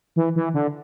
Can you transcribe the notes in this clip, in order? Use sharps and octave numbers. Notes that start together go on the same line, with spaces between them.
E3
E3
D3